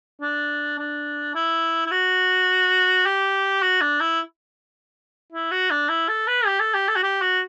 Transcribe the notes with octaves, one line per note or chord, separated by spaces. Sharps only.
D4
D4
E4
E4
F#4
G4
F#4
D4
E4
E4
F#4
D4
E4
A4
B4
G4
A4
G4
A4
F#4
G4
F#4